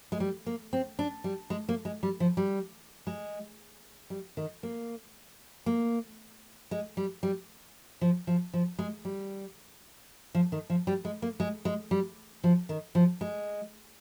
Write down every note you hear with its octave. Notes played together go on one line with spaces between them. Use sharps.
G#3
G3
A#3
C4
D4
G3
G#3
A#3
G#3
G3
F3
G3
G#3
G3
D#3
A#3
A#3
G#3
G3
G3
F3
F3
F3
G#3
G3
F3
D#3
F3
G3
G#3
A#3
G#3
G#3
G3
F3
D#3
F3
G#3